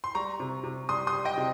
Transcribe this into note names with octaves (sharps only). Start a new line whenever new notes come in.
C6
G3 A#5 C#6
C3
C3
G3 C6 D#6
C6 D#6
G3
D#5 G5
C3